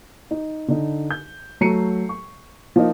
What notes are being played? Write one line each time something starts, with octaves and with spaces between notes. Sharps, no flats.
D#4
D3 D#4
G6
F#3 A3 A#5 C7 C#7 D#7
C#6
F3 A#3 D#4